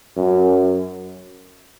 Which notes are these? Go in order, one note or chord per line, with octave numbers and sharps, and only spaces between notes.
F#2